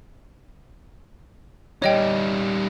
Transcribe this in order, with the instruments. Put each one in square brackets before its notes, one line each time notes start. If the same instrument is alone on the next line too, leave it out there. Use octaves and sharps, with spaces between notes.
[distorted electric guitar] G3 D#4 [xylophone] C#5 D#5 G5